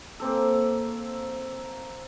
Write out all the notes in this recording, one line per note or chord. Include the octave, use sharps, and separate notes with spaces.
A#3 C4 A4